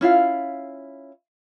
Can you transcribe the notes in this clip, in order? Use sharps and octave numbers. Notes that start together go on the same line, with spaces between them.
C#4 E4 F4 F5